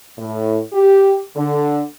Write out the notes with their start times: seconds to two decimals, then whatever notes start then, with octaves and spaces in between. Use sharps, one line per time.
0.18 A2
0.73 G4
1.36 D3